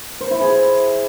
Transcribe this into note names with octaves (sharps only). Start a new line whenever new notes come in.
C5
E4
G#4